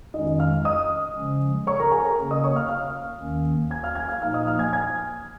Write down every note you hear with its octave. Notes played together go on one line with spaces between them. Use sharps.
F2 D#3 G#3 C#4 D#4 D#5
D#4 D#5
F5 F6
D#5 D#6
C#3 F3 G#3 C#4
C#5 C#6
A#4 A#5
G#4 G#5
A#4 A#5
C#3 A#3 C#4
D#5 D#6
C#5 C#6
F5 F6
F5 F6
D#2 D#3 A#3 C#4
G#5 G#6
F5 F6
G#5 G#6
F5 F6
A#2 F3 A#3 D#4 F5 F6
D#5 D#6
F5 F6
G#5 G#6
G#5 G#6